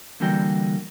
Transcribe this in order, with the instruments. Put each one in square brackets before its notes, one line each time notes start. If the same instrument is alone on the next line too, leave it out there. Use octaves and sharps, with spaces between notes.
[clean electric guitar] D3 E3 G3 A#3 F#4 G5